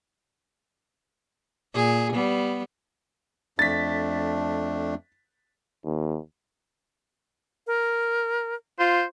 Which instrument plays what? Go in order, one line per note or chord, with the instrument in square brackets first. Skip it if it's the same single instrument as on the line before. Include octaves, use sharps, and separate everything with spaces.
[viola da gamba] A#2 G#4
G3 B3
[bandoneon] F2 A3 D4 [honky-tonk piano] A6 B6
[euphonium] D#2
[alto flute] A#4
[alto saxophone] F4 [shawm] C5